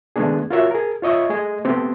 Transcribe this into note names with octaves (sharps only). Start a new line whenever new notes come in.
D#3 G#3 A3 B3 D4 G#4
F4 F#4 A#4 C#5 E5
G#4 A#4
F4 C#5 D#5 E5 C#6
A3 G#4 D#5
A3 B3 C4 G4